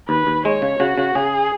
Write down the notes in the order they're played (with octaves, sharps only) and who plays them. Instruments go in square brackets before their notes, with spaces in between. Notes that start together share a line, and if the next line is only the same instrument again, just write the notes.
[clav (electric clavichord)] D#2 [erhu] B4
[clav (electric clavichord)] D#2
[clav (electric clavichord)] G#3 [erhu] C#5
[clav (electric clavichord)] C#3
[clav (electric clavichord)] C#3 [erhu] F#4
[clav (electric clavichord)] C#3
[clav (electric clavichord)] C#3 [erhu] G#4